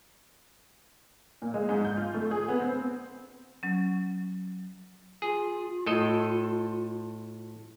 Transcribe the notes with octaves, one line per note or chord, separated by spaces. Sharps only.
A#2
G#3
G#2
G6
F4
A3
G#4
B3
C4
F#3 C#4
F4 G#4
A2 A4 D#5